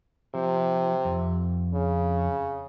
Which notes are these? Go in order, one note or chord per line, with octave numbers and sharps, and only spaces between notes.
C3 F3
F2
C#3